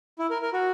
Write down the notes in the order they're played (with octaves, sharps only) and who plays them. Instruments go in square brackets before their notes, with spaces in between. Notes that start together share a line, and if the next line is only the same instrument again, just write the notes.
[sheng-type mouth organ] E4
A#4
A#4
F#4